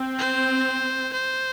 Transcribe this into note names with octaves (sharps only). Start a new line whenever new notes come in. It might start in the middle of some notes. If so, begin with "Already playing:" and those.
Already playing: C4
C5
C5